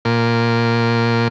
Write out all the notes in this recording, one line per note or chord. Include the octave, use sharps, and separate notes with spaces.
A#2